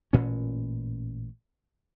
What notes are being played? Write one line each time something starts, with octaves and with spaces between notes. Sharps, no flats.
A1 A#2 C#4